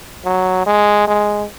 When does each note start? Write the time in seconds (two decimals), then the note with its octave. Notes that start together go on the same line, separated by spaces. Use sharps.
0.25 F#3
0.66 G#3
1.07 G#3